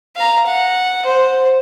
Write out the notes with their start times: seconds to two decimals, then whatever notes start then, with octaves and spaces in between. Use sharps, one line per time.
0.16 F5 A#5
0.46 F#5
1.05 C5